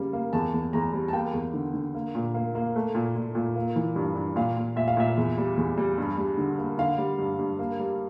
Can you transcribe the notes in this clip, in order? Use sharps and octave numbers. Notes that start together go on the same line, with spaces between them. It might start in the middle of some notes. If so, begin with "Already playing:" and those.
Already playing: C#3 G3 A#3
A#3
E2 A5
E2
E2 A#5
G3
A5
A#3 G5
E2
D3
D3
A#3
A#2
A#3
A#3
A3
A#2
A#2
A#2
A#3
E3
G2
G2
A#2 F5
A#2
A#2 E5
F5
A#2 E5
E2
G3
E2
G3
G2
G3
D3
A#3
D3 F5
G3
G2
G2
A#3
G3